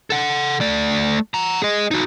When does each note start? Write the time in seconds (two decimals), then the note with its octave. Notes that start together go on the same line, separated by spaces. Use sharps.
0.10 A4 F#5
0.61 A3 D5
1.34 F#5 A#5
1.62 G#4 D#5
1.91 D#4 F#4